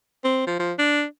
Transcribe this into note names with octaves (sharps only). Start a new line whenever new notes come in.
C4
F3
F3
D4